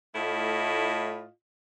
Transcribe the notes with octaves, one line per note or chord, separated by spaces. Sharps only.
A2 A3 E4 F4 D#5